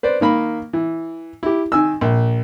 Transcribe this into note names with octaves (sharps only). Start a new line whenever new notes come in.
B4 C5 D5
D#3 A#3 B5
E3
E4 G4
D#3 G#5 E6
A#1